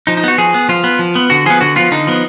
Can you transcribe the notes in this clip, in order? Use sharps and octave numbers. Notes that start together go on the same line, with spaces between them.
F3 D#4
D#4
B3 F#4
F3 G#4
B3
F3 F4
B3
F3
B3
D3 F#4
F3 B3 G#4
D3 F#4
F3 B3 F4
D3 D#4
F3 B3